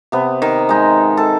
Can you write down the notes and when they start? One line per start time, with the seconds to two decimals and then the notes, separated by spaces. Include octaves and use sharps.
0.12 C3 B3
0.42 D#3
0.69 G#3 D#4
1.17 A4